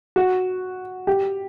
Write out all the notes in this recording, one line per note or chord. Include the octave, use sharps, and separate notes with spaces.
F#4
G4